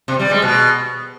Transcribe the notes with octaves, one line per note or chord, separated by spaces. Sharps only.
C3
G3
G#3
B2